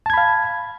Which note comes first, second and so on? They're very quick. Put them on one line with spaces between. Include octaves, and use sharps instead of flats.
A5 G#6 B5 F5